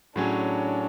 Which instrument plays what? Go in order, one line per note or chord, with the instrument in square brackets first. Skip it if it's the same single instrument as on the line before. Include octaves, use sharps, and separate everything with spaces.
[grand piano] A2 F#3 C#4 G#4 [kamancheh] D4